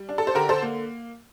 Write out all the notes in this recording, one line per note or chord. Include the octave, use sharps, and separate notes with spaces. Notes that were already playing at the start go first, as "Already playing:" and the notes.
Already playing: G3
D4
A4
C5
D3 G4 A#4
A4 C5
A#3